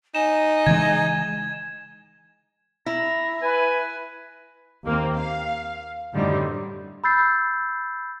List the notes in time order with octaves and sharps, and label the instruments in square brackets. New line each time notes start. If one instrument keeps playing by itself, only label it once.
[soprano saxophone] D#4 [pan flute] G#5 [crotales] E7
[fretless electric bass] C#3 E3 G#3 [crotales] G#6
[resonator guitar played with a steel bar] E4 [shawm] A#5
[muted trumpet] B4 [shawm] G#5
[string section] D#2 A#3 C4
F5
F#2 A2 D3 D#3 G3 C4
[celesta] B5 E6 G6 A6 C7